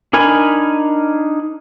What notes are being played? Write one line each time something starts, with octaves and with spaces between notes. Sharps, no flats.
D4 D#4 A#4 G#5 B5